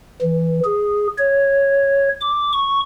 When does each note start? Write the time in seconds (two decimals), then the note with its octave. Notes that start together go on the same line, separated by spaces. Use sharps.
0.22 E3
0.64 G#4
1.18 C#5
2.21 D6
2.53 C#6